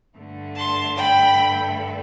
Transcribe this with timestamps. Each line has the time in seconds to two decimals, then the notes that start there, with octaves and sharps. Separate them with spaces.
0.16 G2 D3 A3
0.57 A5 C6
0.97 G5 B5